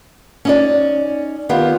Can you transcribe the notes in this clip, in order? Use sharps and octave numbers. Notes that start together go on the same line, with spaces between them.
C#4 D#4 D5
D#3 B3 F4 G4